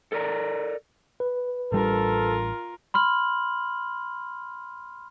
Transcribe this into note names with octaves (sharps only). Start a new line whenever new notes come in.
A4 A#4 D5 A#5
B4
A1 G3 D4 F4 A4 A#4
B5 C6 F6 F#7